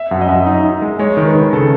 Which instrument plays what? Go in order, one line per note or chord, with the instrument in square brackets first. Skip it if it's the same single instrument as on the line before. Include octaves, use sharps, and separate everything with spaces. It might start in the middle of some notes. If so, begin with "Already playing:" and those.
Already playing: [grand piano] E5
[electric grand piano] F#2 [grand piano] F#5
[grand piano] D#5
[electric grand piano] F#2 [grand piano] E5
[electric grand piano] D#4
D#4
G#3
[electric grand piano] G#3 [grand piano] C#5
[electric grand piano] D#3
[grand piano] B4
[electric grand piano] D#3
[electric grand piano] C#3 [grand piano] A4